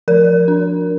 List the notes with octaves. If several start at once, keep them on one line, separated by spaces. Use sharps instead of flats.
F3 A#4
D4